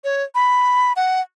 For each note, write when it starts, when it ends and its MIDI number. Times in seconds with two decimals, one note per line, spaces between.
0.04 0.23 73
0.35 0.93 83
0.96 1.21 78